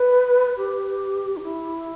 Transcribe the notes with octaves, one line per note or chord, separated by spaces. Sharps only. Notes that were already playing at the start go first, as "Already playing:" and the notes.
Already playing: B4
G4
D4
E4